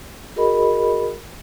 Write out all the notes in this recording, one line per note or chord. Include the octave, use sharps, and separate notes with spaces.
F#4 G#4 A#4 D#5 B5